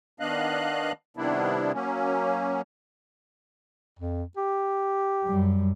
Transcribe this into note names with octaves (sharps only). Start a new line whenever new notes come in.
D#3 B3 D4 D#5 F5 F#6
C3 D#3 G3 B3 D4 E4
F#3 A#3 C#4
F2
G4
F#2 G3